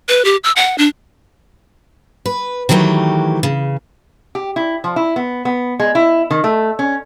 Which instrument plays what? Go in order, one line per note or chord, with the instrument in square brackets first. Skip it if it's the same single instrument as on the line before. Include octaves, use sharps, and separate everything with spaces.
[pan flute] B4
G4
E6
F#5
D4
[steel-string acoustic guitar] B4
D#3 E3 F#3 A3 G4
C#3
[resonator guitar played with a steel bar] G4
E4
F3
E4
B3
B3
G#3
E4
D#3
A3
C#4